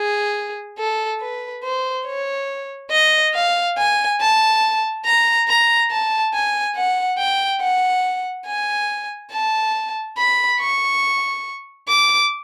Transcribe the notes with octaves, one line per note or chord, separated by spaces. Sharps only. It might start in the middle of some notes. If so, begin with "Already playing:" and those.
Already playing: G#4
A4
B4
C5
C#5
D#5
F5
G#5
A5
A#5
A#5
A5
G#5
F#5
G5
F#5
G#5
A5
B5
C#6
D6